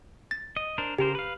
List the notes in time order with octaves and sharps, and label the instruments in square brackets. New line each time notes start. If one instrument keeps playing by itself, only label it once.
[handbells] A6
[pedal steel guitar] D#5
D4 A#4 C5
[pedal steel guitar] C#3 A#4 C5 [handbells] G4
[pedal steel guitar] B4 F5